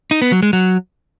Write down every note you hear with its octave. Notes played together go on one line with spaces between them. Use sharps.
D#4
B3
F#3
G#3
F#3